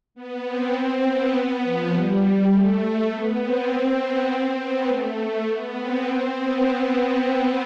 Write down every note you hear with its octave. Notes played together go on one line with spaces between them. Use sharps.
B3
C4
B3
F3
G3
A3
B3
C4
B3
C4
B3
A3
B3
C4
B3